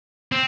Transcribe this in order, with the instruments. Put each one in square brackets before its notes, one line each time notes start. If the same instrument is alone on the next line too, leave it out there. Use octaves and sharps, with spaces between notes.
[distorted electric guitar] C4